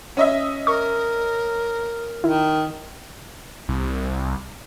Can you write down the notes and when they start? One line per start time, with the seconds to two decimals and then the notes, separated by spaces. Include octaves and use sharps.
0.17 C#4 D#5 E5
0.67 A#4 C#6
2.24 D#3 E4
3.69 C2